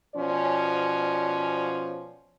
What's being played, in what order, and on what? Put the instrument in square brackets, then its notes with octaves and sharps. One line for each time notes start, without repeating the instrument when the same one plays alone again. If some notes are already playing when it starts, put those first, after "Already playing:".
[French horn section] B2 F3 C#4 D5